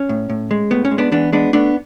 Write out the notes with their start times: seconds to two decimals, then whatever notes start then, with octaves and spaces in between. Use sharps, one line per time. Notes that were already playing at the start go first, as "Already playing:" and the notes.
Already playing: C#4
0.09 A2
0.30 A2
0.51 G#3
0.71 A2 B3
0.85 C#4
0.91 G#3
0.98 B3 D4
1.12 E3 B3 D4
1.32 G#3 B3 D4
1.53 A3 B3 D4